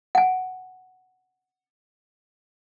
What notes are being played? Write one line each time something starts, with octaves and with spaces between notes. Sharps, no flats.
F#5 G#5